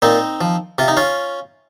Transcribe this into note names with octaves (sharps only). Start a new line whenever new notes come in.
A#2 C4 D#4
F3
C3 F4
D#4
C#4 F4